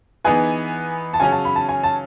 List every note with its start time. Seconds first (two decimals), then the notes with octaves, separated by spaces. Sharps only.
0.24 E3 B3 D#4 G#4 B4 G#5
1.13 A5
1.20 C#3 F#3 C#4 G#5
1.32 A5
1.45 B5
1.56 A5
1.69 G#5
1.83 A5